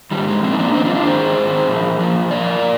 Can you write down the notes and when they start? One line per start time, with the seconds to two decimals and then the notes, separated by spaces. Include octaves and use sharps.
0.11 G#2 D#3 G3
0.28 G#3
0.43 A#2 F3 G#3 C4
0.52 D#4
0.59 A#3 D4
0.74 G2 D#3 C4 D#4
0.85 D4 F4
0.95 D4 F4
1.05 G#2 D#3 G#4 C5
1.37 G#2 D#3
1.69 A#2 F3
1.99 A#2 F3
2.31 G2 D#3 A#4 D5
2.63 A#2